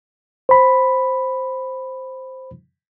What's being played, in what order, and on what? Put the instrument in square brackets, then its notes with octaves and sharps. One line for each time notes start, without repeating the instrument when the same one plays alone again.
[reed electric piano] C5 B5